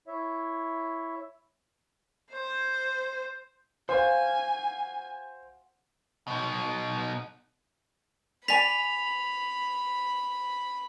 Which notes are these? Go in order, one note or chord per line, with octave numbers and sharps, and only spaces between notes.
E4 C#5 E5
C5
F#4 C5 F5 G#5
B2 D#4
D5 G#5 B5 B6 F7